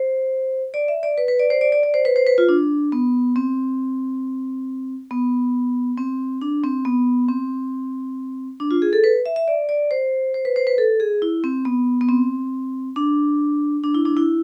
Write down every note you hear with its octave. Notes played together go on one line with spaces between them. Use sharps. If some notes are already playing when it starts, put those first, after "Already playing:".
Already playing: C5
D5
E5
D5
B4
B4
D5
C5
D5
D5
D5
C5
B4
C5
B4
F4
D4
B3
C4
B3
C4
D4
C4
B3
C4
D4
F4
G#4
A4
B4
E5
E5
D5
D5
C5
C5
B4
C5
B4
A4
G#4
E4
C4
B3
B3
C4
D4
D4
E4
D4
E4